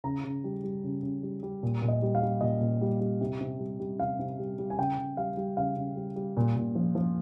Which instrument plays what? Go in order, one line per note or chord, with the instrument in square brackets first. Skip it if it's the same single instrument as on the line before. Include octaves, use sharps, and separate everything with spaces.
[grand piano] C#3 A#5
C#3
G3
G3
C#3
C#3
G3
G3
A#2
A#2
D#5
G3
F5
G3
A#2 D#5
A#2
G3
G3
C3
C3
G3
G3
C3 F5
C3
G3
G3
G#5
C#3 G5
C#3
G3 F5
G3
C#3 F5
C#3
G3
G3
A#2
A#2
F3
F3